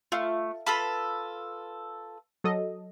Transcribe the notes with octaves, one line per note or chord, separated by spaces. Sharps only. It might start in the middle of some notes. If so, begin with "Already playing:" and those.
A3 F4 F5
F4 A4 B4 A5 B5
F#3 A4 D#5